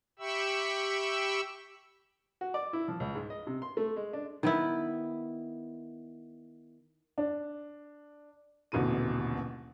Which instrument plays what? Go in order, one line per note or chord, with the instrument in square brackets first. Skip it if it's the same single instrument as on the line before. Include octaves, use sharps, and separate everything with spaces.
[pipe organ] G4 E5 G5 B5 C#6 E6
[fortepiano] F#4
D5
E4
F3
C#2
G#2
D#5
C3
C6
A3
G#3
D4
[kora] D#3 B3 E4
[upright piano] D4
[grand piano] D#1 A1 B2 D3 D#7